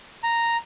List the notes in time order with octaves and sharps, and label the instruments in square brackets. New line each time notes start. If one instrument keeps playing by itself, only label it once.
[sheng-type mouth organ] A#5